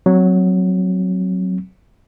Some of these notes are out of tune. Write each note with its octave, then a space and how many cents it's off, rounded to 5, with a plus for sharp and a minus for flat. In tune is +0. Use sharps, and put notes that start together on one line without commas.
F#3 +0 C4 +0